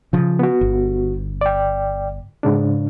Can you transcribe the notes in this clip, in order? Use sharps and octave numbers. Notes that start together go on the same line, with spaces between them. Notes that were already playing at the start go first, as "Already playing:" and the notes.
C#3 F3
B3 F#4
G1
D5 G5
G#2 C#3 D4